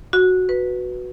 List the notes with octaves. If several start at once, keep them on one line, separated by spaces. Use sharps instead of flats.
F#4
B4